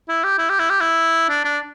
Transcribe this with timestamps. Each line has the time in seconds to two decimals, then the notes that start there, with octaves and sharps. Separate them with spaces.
0.09 E4
0.24 G4
0.38 E4
0.49 G4
0.59 E4
0.70 G4
0.80 E4
1.29 D4
1.45 D4